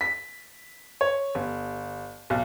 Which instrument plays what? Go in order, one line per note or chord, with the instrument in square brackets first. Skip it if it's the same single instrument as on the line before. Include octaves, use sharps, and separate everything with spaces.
[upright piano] B6
C#5
G1
B1